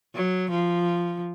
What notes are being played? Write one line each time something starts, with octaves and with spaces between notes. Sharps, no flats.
F#3
F3